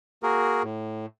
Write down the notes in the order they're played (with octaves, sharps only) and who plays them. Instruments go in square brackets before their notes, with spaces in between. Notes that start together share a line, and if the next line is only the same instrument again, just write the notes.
[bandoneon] A#3 F#4 G#4 A#4
A2